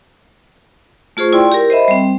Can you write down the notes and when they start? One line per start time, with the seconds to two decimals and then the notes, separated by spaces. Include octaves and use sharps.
1.17 A3 F4 G#4 C5 C#6
1.33 E4 D5 G5 C6
1.52 G4 A#4
1.70 C5 D#5 E5 B5
1.88 G3 C4